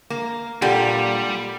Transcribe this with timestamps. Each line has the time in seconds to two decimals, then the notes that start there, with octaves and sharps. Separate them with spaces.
0.10 A#3
0.62 A#2 D3 G3 G4